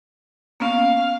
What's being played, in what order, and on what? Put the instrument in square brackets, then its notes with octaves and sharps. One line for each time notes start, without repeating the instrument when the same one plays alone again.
[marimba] A#3 B3 C#4 [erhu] F5